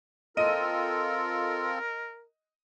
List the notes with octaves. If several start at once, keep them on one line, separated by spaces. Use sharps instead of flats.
C4 F4 A4 A#4 D#5 D#7